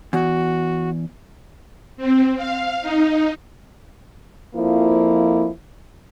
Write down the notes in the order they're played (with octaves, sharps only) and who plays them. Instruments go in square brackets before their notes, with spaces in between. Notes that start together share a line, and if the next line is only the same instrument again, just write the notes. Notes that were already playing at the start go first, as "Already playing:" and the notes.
[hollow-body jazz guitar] E2 [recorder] F#4
[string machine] C4
F5
D#4
[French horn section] F2 F3 A#3 E4